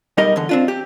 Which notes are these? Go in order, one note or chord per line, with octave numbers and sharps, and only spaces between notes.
B1 G3 D#4 G4 A#4 D#5
E2 D3
C4 D4 F4
G4